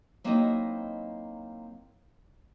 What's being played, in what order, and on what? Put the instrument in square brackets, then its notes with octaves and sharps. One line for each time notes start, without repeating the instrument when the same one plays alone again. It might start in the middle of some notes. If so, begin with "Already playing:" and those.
[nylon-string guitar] F#3 A#3 C4 D#4 E4 D#5